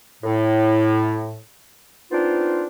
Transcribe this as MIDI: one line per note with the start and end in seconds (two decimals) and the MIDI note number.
0.23 1.37 45
2.11 2.66 59
2.11 2.66 60
2.11 2.66 62
2.11 2.66 63
2.11 2.66 65